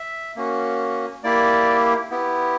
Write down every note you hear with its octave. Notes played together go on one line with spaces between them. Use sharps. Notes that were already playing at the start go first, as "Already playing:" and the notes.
Already playing: E5
A#3 C#4 F#4
A#3 E4 G4 D5
B3 E4 G4